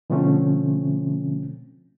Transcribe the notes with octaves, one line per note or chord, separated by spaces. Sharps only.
B2 D3 F3 A3 C4 C#4